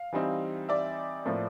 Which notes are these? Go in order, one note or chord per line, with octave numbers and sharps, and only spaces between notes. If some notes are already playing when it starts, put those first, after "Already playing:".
Already playing: F5
E3 G3 C4 D#4
D5 E5
A2 F3 A#3